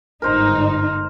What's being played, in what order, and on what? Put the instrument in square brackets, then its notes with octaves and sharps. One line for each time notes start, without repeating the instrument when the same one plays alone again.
[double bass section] G1 G#2 [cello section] D#4 [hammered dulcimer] A#4 C5 A#5